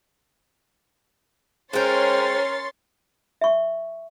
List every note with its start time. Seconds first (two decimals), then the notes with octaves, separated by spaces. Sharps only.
1.73 G#3 C#4 A#4 C5 C#5 G5 C6 A6
3.41 E5 C#6